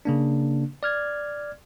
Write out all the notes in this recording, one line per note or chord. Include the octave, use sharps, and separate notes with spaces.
C#3 A#3 D4
D5 F6 G#6